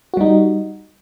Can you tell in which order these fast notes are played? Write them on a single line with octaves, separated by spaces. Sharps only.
F#4 G3 D#4